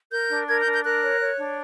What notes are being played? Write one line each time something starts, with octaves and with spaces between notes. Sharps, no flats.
A#4 G6
D4
A#4 G#6
G6
D4
G6
A#4 F#6
C#5
C#5
D4